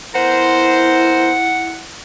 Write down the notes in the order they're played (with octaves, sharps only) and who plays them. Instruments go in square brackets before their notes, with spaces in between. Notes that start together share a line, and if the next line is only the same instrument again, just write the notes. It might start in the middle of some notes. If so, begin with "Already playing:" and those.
[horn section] B3 A#4 C5 [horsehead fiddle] E4 [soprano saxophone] F#5